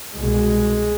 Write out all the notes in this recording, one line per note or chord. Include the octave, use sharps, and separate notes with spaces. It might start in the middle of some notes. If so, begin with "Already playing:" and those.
C2 B2 G#3